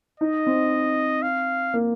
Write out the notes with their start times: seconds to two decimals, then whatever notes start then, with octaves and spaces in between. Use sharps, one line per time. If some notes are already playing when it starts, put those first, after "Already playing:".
0.20 D#4 D#5
0.46 C4
1.23 F5
1.74 A#3